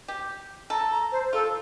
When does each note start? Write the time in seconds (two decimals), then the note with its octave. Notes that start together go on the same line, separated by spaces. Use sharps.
0.08 G4
0.70 A4 A#5
0.91 A#5
1.12 C5
1.33 F4 A4